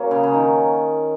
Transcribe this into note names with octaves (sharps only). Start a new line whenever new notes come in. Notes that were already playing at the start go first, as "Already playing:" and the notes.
Already playing: F#3 A#3 C#4
C#3
C#3
D#3